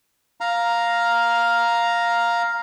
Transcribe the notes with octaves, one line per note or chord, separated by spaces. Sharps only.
F5 A#5